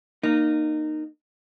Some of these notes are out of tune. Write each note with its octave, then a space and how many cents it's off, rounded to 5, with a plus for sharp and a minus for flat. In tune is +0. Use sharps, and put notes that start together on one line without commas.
A#3 +0 D#4 -20